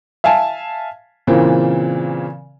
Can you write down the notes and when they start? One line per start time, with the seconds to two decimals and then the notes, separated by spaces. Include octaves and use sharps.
0.24 E5 F5 G#5 A5
1.27 A#2 C#3 E3 A#3 C4